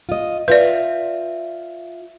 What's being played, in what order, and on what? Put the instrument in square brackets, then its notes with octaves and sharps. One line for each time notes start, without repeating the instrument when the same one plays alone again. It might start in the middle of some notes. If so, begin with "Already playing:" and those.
[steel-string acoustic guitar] F4 D#5
[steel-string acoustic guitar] F4 E5 [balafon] B4 D5